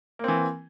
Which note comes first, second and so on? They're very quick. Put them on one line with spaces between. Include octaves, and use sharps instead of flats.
A#3 C4 E3